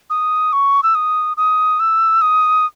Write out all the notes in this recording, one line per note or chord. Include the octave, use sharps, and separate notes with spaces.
D#6
C#6
E6
D#6
D#6
E6
D#6